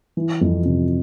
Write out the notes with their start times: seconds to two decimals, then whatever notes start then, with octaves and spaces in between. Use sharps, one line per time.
0.17 E3
0.41 F2
0.65 C3